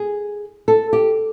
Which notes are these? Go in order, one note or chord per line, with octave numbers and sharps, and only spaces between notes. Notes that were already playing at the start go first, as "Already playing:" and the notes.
Already playing: G#4
A4
G4